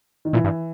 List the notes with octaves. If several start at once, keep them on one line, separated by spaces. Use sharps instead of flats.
D#3
A#2 E3
G2